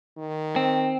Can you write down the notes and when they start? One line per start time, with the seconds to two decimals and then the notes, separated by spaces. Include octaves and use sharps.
0.17 D#3
0.56 C4